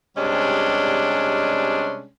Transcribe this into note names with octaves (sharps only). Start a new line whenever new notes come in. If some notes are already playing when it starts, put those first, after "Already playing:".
C3 G3 G#3 C#4 D4